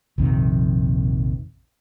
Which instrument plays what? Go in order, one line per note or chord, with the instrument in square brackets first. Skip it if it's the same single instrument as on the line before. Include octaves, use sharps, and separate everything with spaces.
[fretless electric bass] A#1 F2 C3 D#3